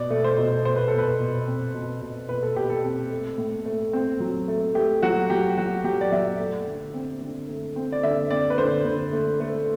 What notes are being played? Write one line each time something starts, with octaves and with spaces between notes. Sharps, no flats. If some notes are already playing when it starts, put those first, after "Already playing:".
Already playing: B2 D5
A3
C5
B2
B2 C5
B4
A4
B2
B4
B2
C4
B2
B2
B2 B4
A4
B2 G4
A4
C4
A3
A2
A3
C4
F#3
A3
A3 G4
F#3 F#4
F#3 G4
F#3 F#4
F#3 G4
D5
F#3 E5
A3
D3
C4
D3
A3
C4
D5
D3 E5
C4 D5
B4
D3 C5
D3
A3
A3